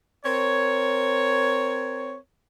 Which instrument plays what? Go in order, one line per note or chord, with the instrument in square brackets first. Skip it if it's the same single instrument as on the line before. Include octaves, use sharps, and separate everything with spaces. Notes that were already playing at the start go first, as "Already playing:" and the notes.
[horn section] C4 A#4 C#5